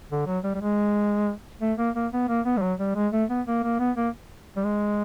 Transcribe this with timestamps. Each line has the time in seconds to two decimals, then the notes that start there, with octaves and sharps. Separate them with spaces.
0.11 D3
0.27 F#3
0.44 G3
0.54 G3
0.61 G#3
1.61 A3
1.78 A#3
1.95 A#3
2.12 B3
2.28 A#3
2.45 B3
2.57 G3
2.62 F#3
2.79 G3
2.95 G#3
3.12 A3
3.30 B3
3.47 A#3
3.63 A#3
3.79 B3
3.96 A#3
4.56 G3
4.64 G#3